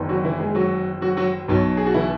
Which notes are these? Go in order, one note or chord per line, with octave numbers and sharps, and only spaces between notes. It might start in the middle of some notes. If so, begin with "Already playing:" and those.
Already playing: F#1 E2 D#3
F#3 F#4
E3 E4
G#3 G#4
F#3 F#4
F#3 F#4
F#3 F#4
B1 B2 F#3
G#4
F#4
E3 E4